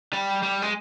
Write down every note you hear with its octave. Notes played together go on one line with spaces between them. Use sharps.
G3
G3
G#3